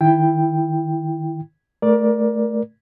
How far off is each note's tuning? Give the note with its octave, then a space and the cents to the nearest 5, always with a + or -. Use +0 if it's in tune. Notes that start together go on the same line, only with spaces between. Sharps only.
D#3 +0 E4 +10 G5 +5
A3 -5 A#4 +25 D5 +0